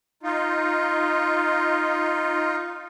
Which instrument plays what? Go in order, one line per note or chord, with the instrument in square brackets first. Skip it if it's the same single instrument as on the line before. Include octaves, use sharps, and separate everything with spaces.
[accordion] D#4 F4